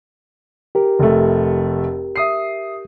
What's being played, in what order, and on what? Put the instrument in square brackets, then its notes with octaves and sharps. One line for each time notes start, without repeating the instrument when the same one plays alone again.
[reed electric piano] G4 A#4
[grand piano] F1 A3
E5 D#6 C7